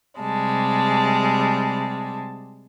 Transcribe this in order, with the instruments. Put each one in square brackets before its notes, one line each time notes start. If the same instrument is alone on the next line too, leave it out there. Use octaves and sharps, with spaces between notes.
[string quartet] C3 G3 G#3 A5